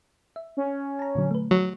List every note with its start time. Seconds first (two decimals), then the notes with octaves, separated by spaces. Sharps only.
0.36 E5
0.57 C#4
0.99 A5 A#5
1.15 A#2 D3 F#3
1.31 A3 B4
1.51 F#3